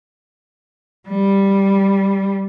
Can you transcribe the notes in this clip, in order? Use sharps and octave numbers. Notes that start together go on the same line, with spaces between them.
G3